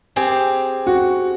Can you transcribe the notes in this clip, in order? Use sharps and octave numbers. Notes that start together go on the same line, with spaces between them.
C4 G4 G#4
F#4